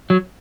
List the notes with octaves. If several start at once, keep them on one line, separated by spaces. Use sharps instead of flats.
F#3